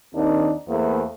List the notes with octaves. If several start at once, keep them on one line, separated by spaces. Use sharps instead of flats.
D#2 D#3 C4 D4 D#4
E2 A3 A#3 G#4 C5